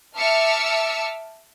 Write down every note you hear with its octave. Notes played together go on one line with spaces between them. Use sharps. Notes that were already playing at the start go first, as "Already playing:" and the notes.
E5 A5 D6 E6 F6 C#7